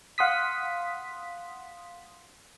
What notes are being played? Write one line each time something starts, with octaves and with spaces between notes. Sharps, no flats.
F5 F#5 C6 D#6 B6